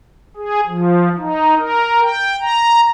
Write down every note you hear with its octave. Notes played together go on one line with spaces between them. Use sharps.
G#4
F3
D#4
A#4
G5
A#5